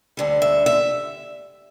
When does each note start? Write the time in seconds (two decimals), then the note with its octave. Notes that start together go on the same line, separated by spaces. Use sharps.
0.17 D2 D3 G3
0.42 E5
0.66 E5